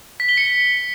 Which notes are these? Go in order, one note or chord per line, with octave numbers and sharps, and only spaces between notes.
B6
G7
C#7